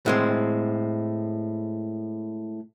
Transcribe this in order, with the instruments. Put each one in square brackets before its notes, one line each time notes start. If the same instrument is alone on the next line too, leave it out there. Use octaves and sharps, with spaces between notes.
[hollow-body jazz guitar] A2 G#3 C4